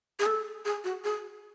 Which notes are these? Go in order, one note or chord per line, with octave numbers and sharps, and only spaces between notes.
G#4
A4
G#4
F#4
G#4